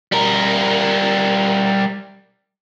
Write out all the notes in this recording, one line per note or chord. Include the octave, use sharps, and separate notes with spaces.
G3 A#4